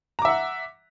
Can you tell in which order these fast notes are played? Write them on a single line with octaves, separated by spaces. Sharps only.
A#5 D6 E5 F#5